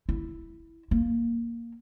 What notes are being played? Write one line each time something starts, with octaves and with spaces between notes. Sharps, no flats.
E4
A#3